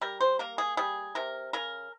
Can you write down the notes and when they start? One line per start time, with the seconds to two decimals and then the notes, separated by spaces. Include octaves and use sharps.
0.01 G3 A#4
0.20 C5
0.39 A#3 A#4
0.58 G#4
0.77 G3 G#4
1.15 C3 A#4
1.53 C#3 A#4